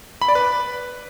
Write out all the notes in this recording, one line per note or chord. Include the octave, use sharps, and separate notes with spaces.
B5
D5
B4